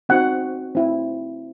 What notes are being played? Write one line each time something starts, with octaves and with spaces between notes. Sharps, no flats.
C4 D#4 F#4 F#5
C4 E4